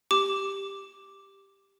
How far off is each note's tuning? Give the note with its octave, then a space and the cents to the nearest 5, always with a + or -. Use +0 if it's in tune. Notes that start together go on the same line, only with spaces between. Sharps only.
G4 +5 D6 +0